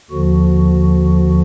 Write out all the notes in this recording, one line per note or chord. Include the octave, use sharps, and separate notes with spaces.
D#2 D3 F3 F#4